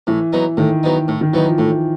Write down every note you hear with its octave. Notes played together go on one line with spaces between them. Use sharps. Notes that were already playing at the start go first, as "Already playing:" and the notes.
A2 E3
F#3 B3 D#4
A2 D#3
F#3 B3 D#4
A2
D#3
E3 F#3 B3 D#4
F3
A2 F3